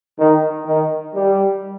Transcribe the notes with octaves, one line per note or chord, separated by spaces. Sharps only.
D#3
D#3
G3